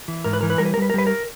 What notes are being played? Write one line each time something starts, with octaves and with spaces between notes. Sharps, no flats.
E3
G#2 A#4
B4
E3 A#4
B4
G3 A#4
B4
A#4
G3 B4
A#4
G3 B4
A#4